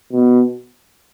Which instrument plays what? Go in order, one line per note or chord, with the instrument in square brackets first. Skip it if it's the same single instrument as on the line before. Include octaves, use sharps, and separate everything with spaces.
[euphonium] B2